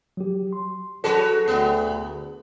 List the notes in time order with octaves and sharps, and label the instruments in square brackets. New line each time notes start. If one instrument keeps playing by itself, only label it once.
[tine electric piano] F#3 G4
C6
[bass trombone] F#3 [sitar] F#4 B4 C#5 [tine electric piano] G#4 [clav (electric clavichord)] A4
[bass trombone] D2 [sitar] B3